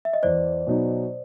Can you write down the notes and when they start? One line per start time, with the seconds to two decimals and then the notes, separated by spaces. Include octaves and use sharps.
0.05 E5
0.13 D#5
0.23 E2 C5 D5
0.67 B2 F#3 B3 D#4